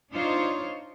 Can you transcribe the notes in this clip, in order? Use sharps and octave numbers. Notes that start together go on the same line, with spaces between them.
D4 D#4 F4 C5 C#5